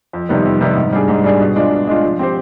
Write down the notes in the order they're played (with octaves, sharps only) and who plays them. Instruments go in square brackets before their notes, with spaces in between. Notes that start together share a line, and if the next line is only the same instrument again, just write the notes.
[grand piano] F2
C3 D#3 G3 B3
F2
C3 D#3 G3 B3
G#2
G3 D4 G#4
G#2
G3 D4 G#4
B2
G#3 D4 F4
B2
G#3 D4 F4
F3
C4 G4 C5